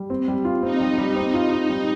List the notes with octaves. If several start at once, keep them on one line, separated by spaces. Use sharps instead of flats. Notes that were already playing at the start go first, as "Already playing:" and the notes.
Already playing: G3
C4
G3
F4
C4 D#4
G3
G3
C4
F4
F4
G3